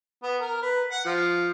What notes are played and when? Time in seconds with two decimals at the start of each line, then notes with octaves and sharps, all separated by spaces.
0.23 B3
0.41 A#4
0.62 B4
0.91 F#5
1.05 F3